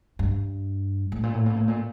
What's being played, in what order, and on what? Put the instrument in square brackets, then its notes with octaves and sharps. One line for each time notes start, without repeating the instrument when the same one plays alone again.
[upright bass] G2
A2
A#2
A2
A#2
A2
A#2